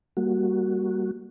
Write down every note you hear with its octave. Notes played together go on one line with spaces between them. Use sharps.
G3 A#3 F#4